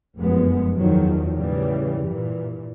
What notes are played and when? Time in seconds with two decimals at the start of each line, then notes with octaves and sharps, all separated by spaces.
0.16 F1 F#2 F3 G#3 B3
0.74 E2 D#3 F3 F#3
1.35 A2 C#3 E3 G3
2.00 G2 A#2 E3